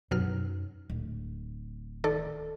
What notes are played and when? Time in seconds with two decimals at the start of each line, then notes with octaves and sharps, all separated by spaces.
0.11 F#2 B2 F#3 D#4 F6
0.90 D1
2.04 D#3 A4 D5